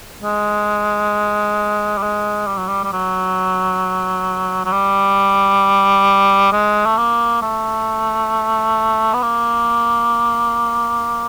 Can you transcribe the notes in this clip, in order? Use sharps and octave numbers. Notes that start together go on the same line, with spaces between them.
G#3
G3
G#3
G3
F#3
G3
G3
F#3
F#3
G3
G#3
A3
A#3
A3
B3
A#3